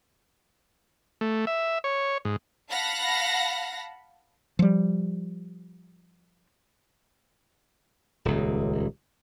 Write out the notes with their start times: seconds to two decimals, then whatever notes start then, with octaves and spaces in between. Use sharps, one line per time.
1.21 A3
1.47 E5
1.84 C#5
2.25 G#2
2.71 F5 F#5 A5 B5 A#6
4.59 F3 G3
8.25 D#1 C#2